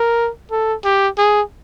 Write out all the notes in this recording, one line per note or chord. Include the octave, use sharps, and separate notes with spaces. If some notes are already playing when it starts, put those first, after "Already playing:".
Already playing: A#4
A4
G4
G#4